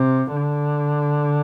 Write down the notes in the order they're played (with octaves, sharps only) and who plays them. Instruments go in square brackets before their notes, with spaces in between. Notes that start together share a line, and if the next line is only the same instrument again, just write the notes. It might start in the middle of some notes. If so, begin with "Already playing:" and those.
Already playing: [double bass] C3
D3